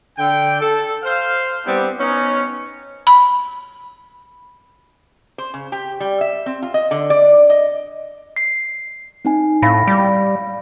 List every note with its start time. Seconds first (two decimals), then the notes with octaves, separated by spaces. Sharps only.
0.18 D3 G5
0.61 A4
1.04 C5 F5
1.65 G3 B3 C4 D4 E4 G4
2.00 B3 C#4 D#4
3.07 B5
5.38 C5
5.54 C#3
5.72 G4
6.00 G3
6.21 E5
6.46 C4
6.62 F4
6.74 D#5
6.91 D3
7.10 D5
7.50 D#5
8.36 C7
9.25 C4 D#4 G#5
9.62 A2 F5 B5 A#6
9.87 G3